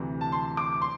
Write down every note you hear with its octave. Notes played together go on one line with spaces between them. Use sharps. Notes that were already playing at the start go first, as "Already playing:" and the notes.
Already playing: D2 C3 E3
A5
C6
D6
C6